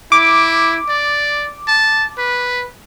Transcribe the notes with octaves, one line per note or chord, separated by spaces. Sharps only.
E4 D6
D5
A5
B4